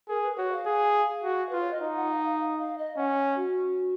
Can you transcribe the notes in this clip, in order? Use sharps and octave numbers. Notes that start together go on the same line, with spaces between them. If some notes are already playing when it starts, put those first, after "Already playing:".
G#4 A#4
B4
F#4 C#5
F5
G#4
F#4
F4 B4
C#5
D#5
D#4 F5
F#5
F5
F5
F5
F5
D#5
C#4 F#5
F#4